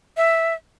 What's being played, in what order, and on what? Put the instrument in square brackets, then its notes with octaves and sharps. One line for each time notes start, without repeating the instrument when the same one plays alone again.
[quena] E5